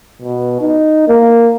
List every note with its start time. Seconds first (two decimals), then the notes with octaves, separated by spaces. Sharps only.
0.22 B2
0.61 D#4
1.08 A#3